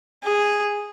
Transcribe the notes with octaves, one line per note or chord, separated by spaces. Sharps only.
G#4